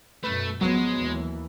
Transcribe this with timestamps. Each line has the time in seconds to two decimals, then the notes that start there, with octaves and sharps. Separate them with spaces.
0.24 F#2 B2 A3 B4
0.61 A1 F3 F#3 G#3 B3
0.97 D#2 E3